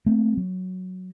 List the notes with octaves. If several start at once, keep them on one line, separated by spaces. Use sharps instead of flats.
A3 A#3 C4
F#3